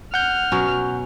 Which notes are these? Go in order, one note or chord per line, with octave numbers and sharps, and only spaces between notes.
F#5 F6 G6
B2 F#3 C#4